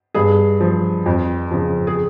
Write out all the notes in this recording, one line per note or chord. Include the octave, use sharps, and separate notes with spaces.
G2 G#4
F3
F2
C#3 F3
G#4